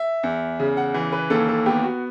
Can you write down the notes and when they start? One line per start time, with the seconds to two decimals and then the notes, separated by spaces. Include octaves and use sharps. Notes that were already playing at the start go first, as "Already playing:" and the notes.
Already playing: E5
0.23 E2
0.60 C#3
0.77 F#5
0.94 E3
1.13 B4
1.30 D#2 A4
1.48 A4
1.66 B3 G4
1.83 F#4